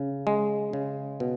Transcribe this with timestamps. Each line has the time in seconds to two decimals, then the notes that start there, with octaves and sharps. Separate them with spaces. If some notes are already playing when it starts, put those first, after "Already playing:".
Already playing: C#3
0.27 G#3
0.73 C#3
1.20 B2